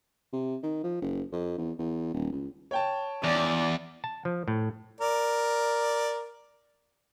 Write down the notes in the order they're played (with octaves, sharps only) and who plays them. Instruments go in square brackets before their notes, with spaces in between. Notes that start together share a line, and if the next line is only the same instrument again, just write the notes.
[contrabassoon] C3
D#3
F3
F#1
F2
E2
E2
D#1
C#2
[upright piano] C#5 G5 A5
[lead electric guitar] E2 [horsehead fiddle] D5
[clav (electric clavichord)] A5
F3
A2
[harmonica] A#4 D5